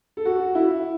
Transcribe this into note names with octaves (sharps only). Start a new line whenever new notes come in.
A4
F#4
E4